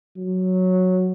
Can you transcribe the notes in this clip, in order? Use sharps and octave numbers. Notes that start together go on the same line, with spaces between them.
F#3